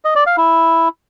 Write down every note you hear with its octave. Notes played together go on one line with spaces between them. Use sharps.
D#5
D5
F5
E4